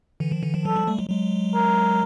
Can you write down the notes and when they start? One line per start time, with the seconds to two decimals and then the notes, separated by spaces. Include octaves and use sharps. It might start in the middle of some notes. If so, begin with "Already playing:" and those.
0.20 D3 E3
0.31 D#3 F3
0.43 D3 E3
0.54 D#3 F3
0.65 E3 F#3 A4
0.76 F3 G3
0.87 G3 A3
0.99 F#3 G#3
1.09 F#3 G#3
1.55 A#4